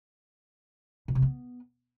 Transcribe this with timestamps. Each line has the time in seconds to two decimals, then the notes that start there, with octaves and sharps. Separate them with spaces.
1.08 B2
1.15 C3
1.22 B3